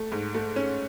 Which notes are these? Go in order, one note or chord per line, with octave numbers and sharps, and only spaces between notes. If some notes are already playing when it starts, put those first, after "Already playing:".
Already playing: A3
G#2
A3
C#4